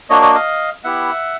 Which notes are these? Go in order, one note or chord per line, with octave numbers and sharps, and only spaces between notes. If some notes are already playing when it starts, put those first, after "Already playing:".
A#3 D4 F#4 C#5 D#5
C#5 D#5
D#5 F5
B3 E4 G4 E5 F#5